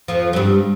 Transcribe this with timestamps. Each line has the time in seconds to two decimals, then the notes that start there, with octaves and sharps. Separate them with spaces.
0.08 F2 F3
0.33 F#3
0.36 G2 G3